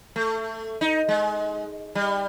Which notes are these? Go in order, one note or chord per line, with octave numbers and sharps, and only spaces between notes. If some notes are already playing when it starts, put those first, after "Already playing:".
A3
D#4
G#3
G3